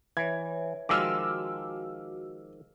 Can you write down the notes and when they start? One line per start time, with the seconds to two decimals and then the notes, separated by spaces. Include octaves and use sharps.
0.17 E3 B4 C#5 E5 G#6
0.89 D#3 F3 G#3 F#4 D6 E6 F6